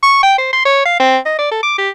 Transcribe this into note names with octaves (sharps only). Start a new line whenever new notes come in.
C#6
G5
C5
C6
C#5
F5
C4
D#5
D5
A4
D6
G4